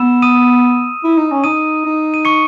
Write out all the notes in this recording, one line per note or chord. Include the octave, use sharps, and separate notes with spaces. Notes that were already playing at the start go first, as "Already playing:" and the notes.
Already playing: B3 E6 E7
D#6 D#7
E4
D#4
C#4
D#4 D#6 D#7
D#4
D#7
C#6 C#7